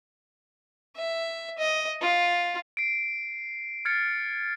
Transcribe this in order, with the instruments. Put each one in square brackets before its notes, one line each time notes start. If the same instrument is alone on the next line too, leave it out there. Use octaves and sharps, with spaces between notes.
[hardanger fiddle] E5
D#5
F4
[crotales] C7 D7
F6 G#6 A6 C7 C#7